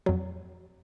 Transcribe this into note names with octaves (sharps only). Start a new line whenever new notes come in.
F2 F#3